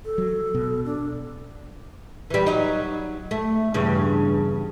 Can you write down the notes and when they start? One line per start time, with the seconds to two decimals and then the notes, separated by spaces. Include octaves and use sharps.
0.05 A4
0.18 F#3
0.54 B2
0.85 D4
2.30 E3 G3
2.46 F#3 D#4
3.31 A3
3.74 E2 G2 C#3